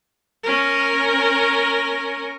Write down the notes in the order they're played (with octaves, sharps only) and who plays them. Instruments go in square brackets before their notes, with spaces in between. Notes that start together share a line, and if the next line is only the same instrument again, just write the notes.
[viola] C#4 A#4